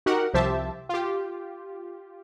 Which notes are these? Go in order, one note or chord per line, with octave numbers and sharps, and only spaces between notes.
D#4 F#4 G4 A#4 F#5
C2 F3 G4 C5 E5 A5
F4 G4